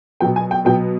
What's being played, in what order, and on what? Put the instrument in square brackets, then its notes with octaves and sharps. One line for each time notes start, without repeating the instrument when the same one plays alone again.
[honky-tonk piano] B2 F#3 B3 G5
G#5
G5
B2 F#3 B3 G5